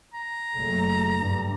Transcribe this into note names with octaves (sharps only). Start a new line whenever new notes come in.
A#5
F#1 A3
G2